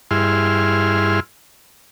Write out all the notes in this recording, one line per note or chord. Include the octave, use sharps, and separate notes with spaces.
G2 E4 G#4 C6 F6